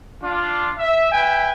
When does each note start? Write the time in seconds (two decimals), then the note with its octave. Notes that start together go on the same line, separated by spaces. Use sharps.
0.23 D4 F4
0.79 E5
1.12 B4 E5 G5 G#5